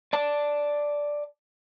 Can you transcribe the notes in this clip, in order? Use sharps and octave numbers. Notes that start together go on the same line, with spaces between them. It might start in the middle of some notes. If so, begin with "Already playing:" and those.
D5 A5